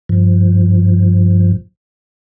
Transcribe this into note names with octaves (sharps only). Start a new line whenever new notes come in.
G2 F3